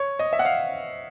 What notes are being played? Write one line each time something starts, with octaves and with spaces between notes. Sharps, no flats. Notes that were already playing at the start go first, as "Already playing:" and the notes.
Already playing: C#5
D#5
E5
F#5
F5